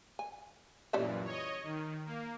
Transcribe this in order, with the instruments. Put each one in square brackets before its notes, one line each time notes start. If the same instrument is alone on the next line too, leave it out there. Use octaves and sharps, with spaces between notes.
[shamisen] G#5
[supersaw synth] F#2 A#2 E3 [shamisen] G3 C#4 E5
[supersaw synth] C#5 D#5
D#3
A#3